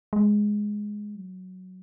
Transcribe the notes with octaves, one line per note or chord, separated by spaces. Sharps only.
G#3
F#3